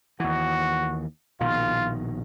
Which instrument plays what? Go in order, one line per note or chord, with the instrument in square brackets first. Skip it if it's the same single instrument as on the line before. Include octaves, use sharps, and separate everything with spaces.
[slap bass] D#2 E3 [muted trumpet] F#4
[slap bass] A#1 B2 D#3 [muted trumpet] F4